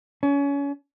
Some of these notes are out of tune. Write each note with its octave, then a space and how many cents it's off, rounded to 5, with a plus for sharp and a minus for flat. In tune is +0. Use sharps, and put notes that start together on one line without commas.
C#4 +30